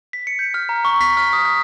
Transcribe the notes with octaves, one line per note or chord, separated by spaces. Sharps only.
B6
C#7
G6
F6
A#5
C#6
B6
F6
D#6
F6